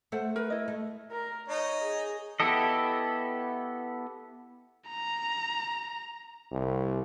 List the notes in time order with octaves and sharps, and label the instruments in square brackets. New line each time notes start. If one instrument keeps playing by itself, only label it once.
[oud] A3 [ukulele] A4 C5 F#5
[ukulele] A#4 B4
E4 D#5
[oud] A3
[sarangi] A#4
[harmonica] D#4 [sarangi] C#5
[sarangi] G#4
[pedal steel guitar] B3 E4 G4 A4 D#5
[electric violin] A#5
[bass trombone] C2